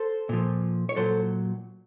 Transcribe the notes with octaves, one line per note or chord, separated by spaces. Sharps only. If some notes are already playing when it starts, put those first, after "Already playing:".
Already playing: A4 C5
A#2 F3
C#5
A#2 F#3 A4 C5